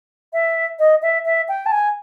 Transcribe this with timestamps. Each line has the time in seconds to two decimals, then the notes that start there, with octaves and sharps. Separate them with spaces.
0.33 E5
0.79 D#5
1.02 E5
1.25 E5
1.48 G5
1.66 A5
1.72 G#5